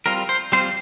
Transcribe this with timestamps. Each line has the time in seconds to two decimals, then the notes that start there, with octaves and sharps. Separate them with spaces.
0.06 G3 C4 F4 A#4
0.29 C5
0.52 G3 C4 F4 C5